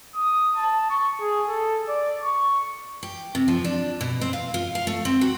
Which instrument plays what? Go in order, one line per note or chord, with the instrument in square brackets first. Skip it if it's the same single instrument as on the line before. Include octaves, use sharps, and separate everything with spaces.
[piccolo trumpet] D#6
A5
C#6
G#4
A4
D5
C#6
[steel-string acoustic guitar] G4
C3
F3
D4
B2
C4
F5
F4
F5
A3
C4
F#4